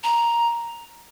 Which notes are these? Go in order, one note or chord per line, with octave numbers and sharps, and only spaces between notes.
A#5